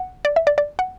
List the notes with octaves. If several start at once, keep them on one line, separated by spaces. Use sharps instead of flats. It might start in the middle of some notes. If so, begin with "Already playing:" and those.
Already playing: F#5
D5
E5
D5
D5
F#5